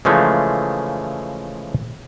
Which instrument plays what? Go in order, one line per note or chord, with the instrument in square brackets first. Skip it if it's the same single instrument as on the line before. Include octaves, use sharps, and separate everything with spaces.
[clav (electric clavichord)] C#3 E3 F3 G#3 A3